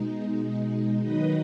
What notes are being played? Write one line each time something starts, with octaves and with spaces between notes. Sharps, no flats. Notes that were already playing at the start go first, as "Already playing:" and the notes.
Already playing: B2 G#3 D#4
D#3 F#3 D#4 B4 D#5